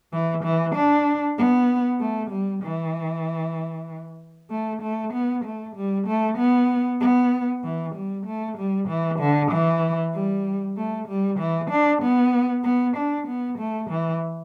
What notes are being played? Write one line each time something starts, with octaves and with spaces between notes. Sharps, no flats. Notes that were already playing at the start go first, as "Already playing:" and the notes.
E3
E3
D4
B3
A3
G3
E3
A3
A3
B3
A3
G3
A3
B3
B3
E3
G3
A3
G3
E3
D3
E3
G3
A3
G3
E3
D4
B3
B3
D4
B3
A3
E3